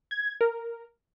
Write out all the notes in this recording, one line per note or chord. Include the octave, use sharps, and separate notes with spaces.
G#6
A#4